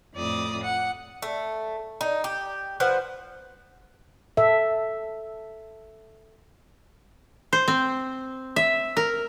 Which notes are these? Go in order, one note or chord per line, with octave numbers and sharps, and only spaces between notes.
F2 A2 D5 D#6
F#5
A3
D#4
G4
F3 B4 C5 F#5
A4 E5
C5
C4
E5
A#4